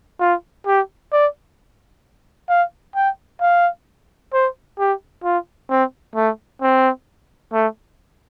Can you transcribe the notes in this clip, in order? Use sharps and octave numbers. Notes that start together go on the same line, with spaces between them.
F4
G4
D5
F5
G5
F5
C5
G4
F4
C4
A3
C4
A3